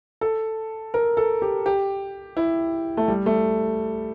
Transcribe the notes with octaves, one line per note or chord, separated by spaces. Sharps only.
A4
A#4
A4
G4
G4
E4
A3
G3
A3